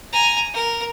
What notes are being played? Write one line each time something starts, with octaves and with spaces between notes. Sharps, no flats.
G#5 A#5
A#4